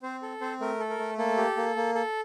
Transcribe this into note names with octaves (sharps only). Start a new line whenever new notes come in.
C4 C5
A4
C4 C5
A3 A#4
A4
A#4
A3
A#3 A4
G4
A#3
A#3
A4